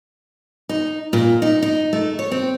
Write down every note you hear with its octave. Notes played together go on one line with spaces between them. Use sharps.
D#4
A#2
D#4
D#4
A3
C#5
C4